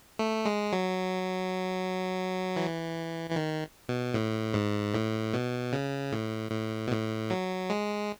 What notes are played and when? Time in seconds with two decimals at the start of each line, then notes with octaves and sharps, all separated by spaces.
0.19 A3
0.45 G#3
0.73 F#3
2.56 E3
3.30 E3
3.36 D#3
3.89 B2
4.14 A2
4.54 G#2
4.94 A2
5.34 B2
5.73 C#3
6.12 A2
6.51 A2
6.88 B2
6.92 A2
7.30 F#3
7.70 G#3